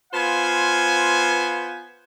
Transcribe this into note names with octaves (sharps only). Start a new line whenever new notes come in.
B3 F4 C5 F5 G#5